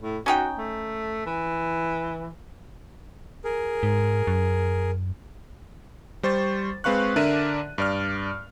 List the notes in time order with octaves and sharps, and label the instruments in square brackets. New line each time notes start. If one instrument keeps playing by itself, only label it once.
[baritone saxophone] A2
[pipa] C#4 D#4 G5 [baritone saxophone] F#4
[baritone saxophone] A3
E3
[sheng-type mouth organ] G#4 A#4
[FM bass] G#2
F#2
[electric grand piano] G3 C5 C#6 A6
G#3 C4 B4 F5 C#6 F#6
D3 D4 A#4 D5 E5 D#7
G2 D5 F6